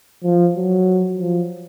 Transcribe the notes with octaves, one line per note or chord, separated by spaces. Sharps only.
F3
F#3
F3